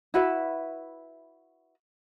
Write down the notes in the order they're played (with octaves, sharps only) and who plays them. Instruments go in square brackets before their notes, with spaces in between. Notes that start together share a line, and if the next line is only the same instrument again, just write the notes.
[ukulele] E4 F#4 B4 E5